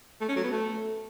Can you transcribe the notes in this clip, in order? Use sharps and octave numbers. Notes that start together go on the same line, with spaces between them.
A3
C#4
F#3
B3
A3